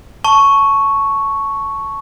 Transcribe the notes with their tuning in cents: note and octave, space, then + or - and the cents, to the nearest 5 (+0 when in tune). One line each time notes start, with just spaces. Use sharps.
A5 +0 C#6 +0